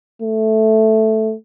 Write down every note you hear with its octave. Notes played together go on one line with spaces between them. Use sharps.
A3